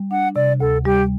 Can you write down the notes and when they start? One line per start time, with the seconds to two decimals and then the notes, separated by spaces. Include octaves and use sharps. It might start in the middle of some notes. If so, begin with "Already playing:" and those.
Already playing: G3
0.11 D4 F#5
0.36 C3 D5
0.60 D2 A4
0.85 G3 G4